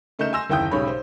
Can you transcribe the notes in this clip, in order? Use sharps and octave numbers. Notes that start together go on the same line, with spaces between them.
C#3 A3 D#4 A#4 G6 E7
G#5 C6 E6 A#6 E7
F#1 D#2 E4 G5 D#6 G6
B1 G#2 C#3 G4 C#5 B5
C5